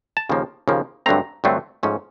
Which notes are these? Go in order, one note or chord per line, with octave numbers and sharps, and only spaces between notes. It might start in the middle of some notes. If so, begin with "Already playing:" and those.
A5
D#2 C#3 F3 A#3
D#2 C#3 F3 A#3
G2 D3 F#3 A3 C4 A#5
G2 D3 F#3 A3 C4
G#2 F3 A3 C#4